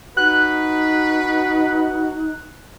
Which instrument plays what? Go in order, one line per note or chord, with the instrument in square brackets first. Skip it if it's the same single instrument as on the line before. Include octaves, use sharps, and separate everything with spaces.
[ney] D#4 [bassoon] F#4 [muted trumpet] B4 [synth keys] F#6